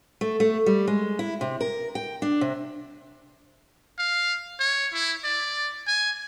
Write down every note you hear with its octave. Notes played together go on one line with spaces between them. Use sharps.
A3
A3
G3
G#3
E4
C3
A#4
G5
D4
C3
F5
C#5
E4
D5
G#5